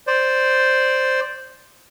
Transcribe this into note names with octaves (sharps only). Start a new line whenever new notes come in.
C5 D5